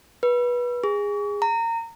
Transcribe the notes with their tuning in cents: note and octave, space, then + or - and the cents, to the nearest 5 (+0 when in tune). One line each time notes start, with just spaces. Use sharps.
B4 -20
G#4 -20
A#5 -25